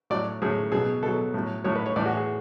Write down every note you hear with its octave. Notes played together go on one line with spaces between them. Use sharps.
A2 F#3 D5
A2 F#3 G#4
B2 F#3 G#4
B2 A4
F#3
A2 F#3
A2 F#3 C#5
B4
C#5
A2 E3 D5
F#4
G#4